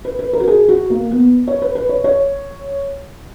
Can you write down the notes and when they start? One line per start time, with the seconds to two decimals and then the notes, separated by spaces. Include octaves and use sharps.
0.05 B4
0.19 B4
0.33 A#4
0.40 F#4
0.48 G#4
0.69 F#4
0.90 A#3
1.11 B3
1.48 C#5
1.62 B4
1.75 B4
1.89 C#5
2.04 C#5